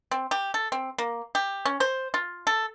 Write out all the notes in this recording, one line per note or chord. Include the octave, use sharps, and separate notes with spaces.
C4
G4
A4
C4
A#3
G4
C#4
C5
F4
A4